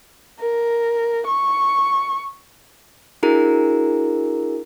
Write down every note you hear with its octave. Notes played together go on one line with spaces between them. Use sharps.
A#4
C#6
D4 E4 F#4 G#4 A#4 A#5